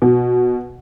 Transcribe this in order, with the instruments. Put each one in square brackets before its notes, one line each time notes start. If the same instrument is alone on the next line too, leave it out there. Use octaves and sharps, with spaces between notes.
[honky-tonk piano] B2